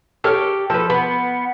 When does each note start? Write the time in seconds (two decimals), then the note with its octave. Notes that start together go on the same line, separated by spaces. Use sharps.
0.24 G4 A4 C#5 F6
0.70 F3 A4 B4
0.90 B3